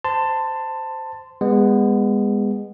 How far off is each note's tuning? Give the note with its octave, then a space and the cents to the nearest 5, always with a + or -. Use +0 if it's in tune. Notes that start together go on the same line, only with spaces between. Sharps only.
C5 -10 A5 +15 C6 -20
G#3 -25 B3 +0